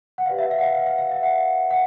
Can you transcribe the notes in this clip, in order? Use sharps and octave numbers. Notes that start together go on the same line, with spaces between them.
F#5
G4 B4 D5 F5
E5
F5
F#5
F5
F5
F5
F5
E5
F#5
F#5